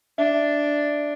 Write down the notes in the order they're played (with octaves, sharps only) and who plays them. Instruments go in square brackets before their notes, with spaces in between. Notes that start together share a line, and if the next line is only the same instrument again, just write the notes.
[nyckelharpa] D4 [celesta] E5